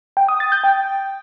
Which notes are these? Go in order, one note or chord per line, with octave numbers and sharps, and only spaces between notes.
G5
D#6
A6
G6
G5